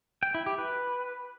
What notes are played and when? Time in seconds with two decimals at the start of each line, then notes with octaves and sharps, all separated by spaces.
0.23 G5
0.35 E4
0.46 G4
0.58 B4